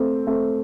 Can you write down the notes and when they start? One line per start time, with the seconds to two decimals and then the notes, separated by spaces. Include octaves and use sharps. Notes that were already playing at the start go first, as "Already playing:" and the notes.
Already playing: A3 C4
0.27 A3 C4